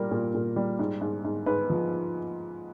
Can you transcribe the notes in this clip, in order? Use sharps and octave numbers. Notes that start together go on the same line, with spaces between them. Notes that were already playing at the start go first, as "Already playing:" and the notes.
Already playing: A#2 G3 A#3 A#4
A#2
A#2
G3
G#2
G#2
G#2
G#2 B4
F3